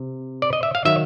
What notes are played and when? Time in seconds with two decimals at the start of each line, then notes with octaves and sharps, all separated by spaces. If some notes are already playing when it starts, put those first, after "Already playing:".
Already playing: C3
0.42 D5
0.53 D#5
0.63 E5
0.75 F5
0.85 D#3 F#3 E5